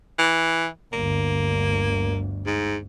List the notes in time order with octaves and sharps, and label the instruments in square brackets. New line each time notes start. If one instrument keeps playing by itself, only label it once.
[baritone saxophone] E3
[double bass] G1 D2 [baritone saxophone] A#3
[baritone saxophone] G#2